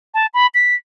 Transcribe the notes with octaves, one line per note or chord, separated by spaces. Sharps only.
A5
B5
B6